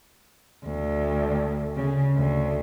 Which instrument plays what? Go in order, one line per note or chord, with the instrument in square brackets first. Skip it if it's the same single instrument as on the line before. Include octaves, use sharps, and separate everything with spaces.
[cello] D2
C#3
D2